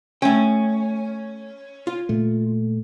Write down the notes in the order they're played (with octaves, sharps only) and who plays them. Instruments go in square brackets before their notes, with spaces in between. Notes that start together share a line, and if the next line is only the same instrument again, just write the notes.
[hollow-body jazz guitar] A3 G5 [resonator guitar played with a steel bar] C#4
[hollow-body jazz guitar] F4
[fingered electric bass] A#2 A3